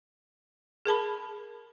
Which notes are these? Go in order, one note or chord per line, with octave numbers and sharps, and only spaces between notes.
G#4 A#4 A5 B5